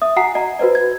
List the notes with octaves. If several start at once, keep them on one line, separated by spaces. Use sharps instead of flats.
E5 D#6
F#4 F#5 G#5 A#5 C7
D#5 A#5
F#4 B4 C5 D#5
G#6